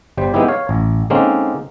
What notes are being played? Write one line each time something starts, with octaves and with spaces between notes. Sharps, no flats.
G1 G3 C5
G#3 B3 C4 D#4 E4 G4
C#5 F5
A1
D3 G#3 A#3 C4 C#4 D#4